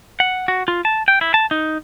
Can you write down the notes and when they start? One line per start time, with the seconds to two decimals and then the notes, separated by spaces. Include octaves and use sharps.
0.20 F#5
0.48 F#4
0.68 F4
0.85 A5
1.08 G5
1.21 E4
1.34 A5
1.51 D#4